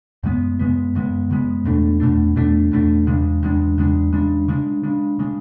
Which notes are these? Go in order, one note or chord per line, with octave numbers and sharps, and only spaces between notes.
F#2 C#3 G#3 B3
F#2 C#3 G#3 B3
F#2 C#3 G#3 B3
F#2 C#3 G#3 B3
E2 B2 A3 D4
E2 B2 A3 D4
E2 B2 A3 D4
E2 B2 A3 D4
E2 C#3 G#3 D4
E2 C#3 G#3 D4
E2 C#3 G#3 D4
E2 C#3 G#3 D4
C#3 G#3 D4
C#3 G#3 D4
C#3 G#3 D4